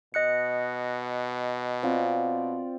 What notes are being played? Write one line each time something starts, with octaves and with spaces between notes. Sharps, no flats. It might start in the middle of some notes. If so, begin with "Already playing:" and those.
B2 D#5 F#6 C#7
C4 F4 D5